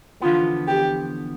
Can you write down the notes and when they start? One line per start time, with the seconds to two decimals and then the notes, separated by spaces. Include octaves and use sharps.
0.22 E2 D3 F3 B3 F4
0.67 G4